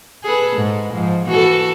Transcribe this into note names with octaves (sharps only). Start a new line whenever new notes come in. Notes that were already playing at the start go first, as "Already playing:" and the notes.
G#4 A4 B4
G#2
G#2 F3
E3 F#4 A4